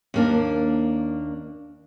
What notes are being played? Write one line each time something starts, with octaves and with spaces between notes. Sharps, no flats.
D#2 A#3 D4